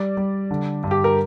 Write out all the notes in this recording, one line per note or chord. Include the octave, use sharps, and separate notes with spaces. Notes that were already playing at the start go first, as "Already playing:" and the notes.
Already playing: G3 D5
G3
D3
G2
G4
A#4